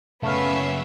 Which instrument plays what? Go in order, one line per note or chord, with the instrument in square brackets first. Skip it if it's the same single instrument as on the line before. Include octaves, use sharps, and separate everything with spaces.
[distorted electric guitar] F#2 C#3 [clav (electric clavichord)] A3 F5 [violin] B3 C7 [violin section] C#4 E5